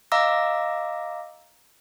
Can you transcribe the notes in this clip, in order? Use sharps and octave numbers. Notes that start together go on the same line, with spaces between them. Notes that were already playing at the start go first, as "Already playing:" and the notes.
D#5 F5 A#5 D6 E6 A#6